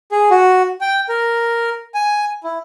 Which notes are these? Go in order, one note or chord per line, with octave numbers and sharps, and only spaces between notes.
G#4
F#4
G5
A#4
G#5
E4